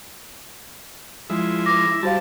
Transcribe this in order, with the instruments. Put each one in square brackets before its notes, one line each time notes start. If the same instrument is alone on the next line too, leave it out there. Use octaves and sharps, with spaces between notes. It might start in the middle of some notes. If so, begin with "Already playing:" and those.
[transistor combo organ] F3 G#3 E4
[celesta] D6 A#6
[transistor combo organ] E4
[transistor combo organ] G3 A5 [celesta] F#4 C5 F5